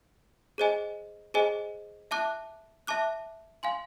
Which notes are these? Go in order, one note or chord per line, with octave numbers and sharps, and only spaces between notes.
G#4 C5 D#5 G#5
G#4 C5 D#5 G#5
E5 A5 D6 F#6
E5 A5 D6 F#6
F5 G#5 C6